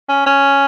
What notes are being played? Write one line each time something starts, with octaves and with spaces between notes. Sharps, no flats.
C#4
C#4